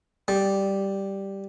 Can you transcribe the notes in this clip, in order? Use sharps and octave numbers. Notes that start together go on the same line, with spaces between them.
G3